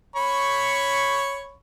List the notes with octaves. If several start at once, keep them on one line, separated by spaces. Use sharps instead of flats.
C#5 B5 C#6